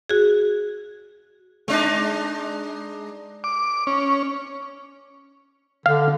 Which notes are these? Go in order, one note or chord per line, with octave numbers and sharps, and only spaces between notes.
F#4 G#4
G#3 D4 D#4
D6
C#4
D3 F5